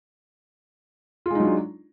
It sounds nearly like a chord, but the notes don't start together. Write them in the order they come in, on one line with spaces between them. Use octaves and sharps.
F4 G#3 D#4 F#3 D4